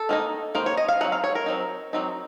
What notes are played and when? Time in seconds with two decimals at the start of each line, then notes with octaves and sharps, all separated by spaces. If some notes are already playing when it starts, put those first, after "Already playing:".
Already playing: A4
0.09 D#3 A#3 D#4
0.55 D#3 A#3 D#4 C5
0.66 C#5
0.77 D#5
0.88 F5
1.01 F#3 C4 D#4 F#5
1.12 F5
1.24 C#5
1.35 A#4
1.46 F#3 C4 D#4
1.93 F#3 C4 D#4